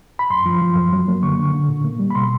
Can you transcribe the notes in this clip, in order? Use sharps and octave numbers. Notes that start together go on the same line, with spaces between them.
B5
F#2 C6
F3
F3
F#2
F#3
A#3
D3 C#6
D3
D3
A#2
A#3
G3
B5
B2 C6